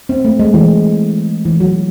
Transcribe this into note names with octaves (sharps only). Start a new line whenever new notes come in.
C4
A3
G#3
E3
E3
F#3